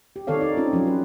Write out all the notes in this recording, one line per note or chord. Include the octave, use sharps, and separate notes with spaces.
G4
D#3 C4 A4 C#5 D5 F5
D#4 D5
C4 C#4 F4
F3 F#3 C#4
B4